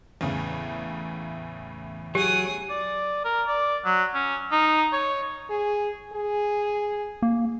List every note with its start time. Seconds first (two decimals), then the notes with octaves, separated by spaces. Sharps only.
0.21 E2 A2 C#3
2.15 F#3 G4 G#4 D#6
2.69 D5
3.24 A#4
3.47 D5
3.85 F#3
4.14 C#4
4.51 D#4
4.93 C#5
5.50 G#4
6.13 G#4
7.22 A#3